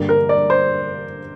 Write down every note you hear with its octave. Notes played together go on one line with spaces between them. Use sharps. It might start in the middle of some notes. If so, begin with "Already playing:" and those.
Already playing: G2 D3 G3 A#3
A#4
D5
C5